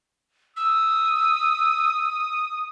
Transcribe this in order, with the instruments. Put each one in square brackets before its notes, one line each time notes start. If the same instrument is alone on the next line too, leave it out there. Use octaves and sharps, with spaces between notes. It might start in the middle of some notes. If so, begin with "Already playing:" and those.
[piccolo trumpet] D#6 [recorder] E6